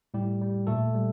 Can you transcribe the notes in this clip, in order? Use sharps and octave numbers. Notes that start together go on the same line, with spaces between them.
A2 G3 G4
G3
A#2 A3 A4
G3